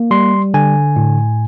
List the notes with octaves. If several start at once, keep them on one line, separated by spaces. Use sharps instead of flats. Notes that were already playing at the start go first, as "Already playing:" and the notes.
Already playing: A#3
G3 C6
D3 G#5
A2